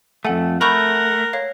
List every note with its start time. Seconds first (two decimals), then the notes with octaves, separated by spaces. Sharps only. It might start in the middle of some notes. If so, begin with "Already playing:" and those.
0.25 F2 A3 A4 F#5 G#5
0.61 A3 A#4 F#5 B5 C#6 G6
1.33 C#5 F5